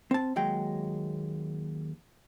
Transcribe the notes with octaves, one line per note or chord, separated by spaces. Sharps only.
C4 A5
D#2 F#3 G#3 G5